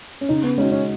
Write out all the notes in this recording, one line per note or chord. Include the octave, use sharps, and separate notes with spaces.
C#4
C#3 D#4
B3
G#3 C#4 D#4 F#4
C#4